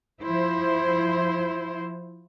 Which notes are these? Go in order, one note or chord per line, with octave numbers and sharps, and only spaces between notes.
F3 E4 C5